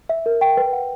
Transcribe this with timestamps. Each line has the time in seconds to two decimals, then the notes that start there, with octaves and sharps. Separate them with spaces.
0.09 E5
0.26 A#4
0.41 G5
0.57 B4
0.73 F#5